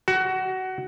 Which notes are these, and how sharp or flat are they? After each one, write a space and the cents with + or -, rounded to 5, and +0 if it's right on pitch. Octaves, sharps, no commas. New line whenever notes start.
F#4 +20